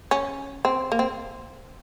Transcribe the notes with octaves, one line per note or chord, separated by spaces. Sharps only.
C#4
C4
A#3
C4